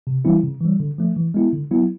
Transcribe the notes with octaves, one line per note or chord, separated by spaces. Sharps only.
C3
E3 G3 C4 E4
C#3
E3 G3
D3
F3 A3
E3
G#3 B3 E4
D3
F#3 B3 E4